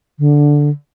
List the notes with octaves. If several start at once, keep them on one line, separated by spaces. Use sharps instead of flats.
D3